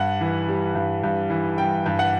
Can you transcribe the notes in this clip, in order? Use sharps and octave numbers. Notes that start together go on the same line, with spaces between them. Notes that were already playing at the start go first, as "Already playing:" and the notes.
Already playing: G2 F#5
E3
G3
G2
G2
E3
G3 G5
G2
F#5